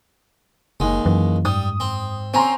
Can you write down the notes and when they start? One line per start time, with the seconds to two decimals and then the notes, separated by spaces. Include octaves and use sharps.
0.80 F#1 D#2 G#3
1.06 F#2 E3
1.45 G#2 G3 D#6
1.80 C4
2.34 C4 C#4 A#5 C6